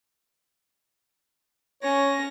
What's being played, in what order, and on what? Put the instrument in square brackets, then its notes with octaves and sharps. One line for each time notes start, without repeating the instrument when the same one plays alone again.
[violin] C#4 A#6 [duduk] C#5